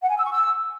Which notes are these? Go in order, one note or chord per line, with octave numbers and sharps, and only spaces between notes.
F#5
G#5
E6
C#6
E6